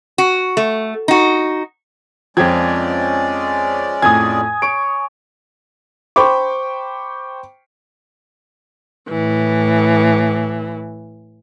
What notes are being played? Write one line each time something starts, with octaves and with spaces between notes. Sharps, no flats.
F#4
A3
D#4 F#4
F2 F3 G#3 C#4 D5 G5 G#6
F2 A2 G#5 D#6 G#6
C#5 D7
C5 G5 B5 C#6 D6
A2 E3